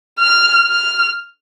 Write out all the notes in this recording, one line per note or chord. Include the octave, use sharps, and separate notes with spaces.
F6
F6